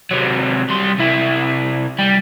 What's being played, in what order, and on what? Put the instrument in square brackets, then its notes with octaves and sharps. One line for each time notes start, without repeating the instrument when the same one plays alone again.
[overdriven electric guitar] C3 F#3
G3 C6
C3 E4
G3